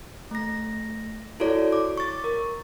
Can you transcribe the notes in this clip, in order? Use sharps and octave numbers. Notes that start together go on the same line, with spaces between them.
A3 A#6
E4 F#4 A4 C#5 D5
D6
C#6 A6
A#4